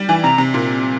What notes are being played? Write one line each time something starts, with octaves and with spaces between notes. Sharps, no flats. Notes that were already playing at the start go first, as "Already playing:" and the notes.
Already playing: G3
E3 G#5
C3 A#5
C3
A#2